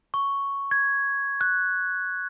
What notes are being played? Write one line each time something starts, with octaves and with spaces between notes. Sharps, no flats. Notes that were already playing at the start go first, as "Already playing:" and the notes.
C#6
G#6
F#6